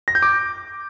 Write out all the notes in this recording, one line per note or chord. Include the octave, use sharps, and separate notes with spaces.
A#6
G6
D6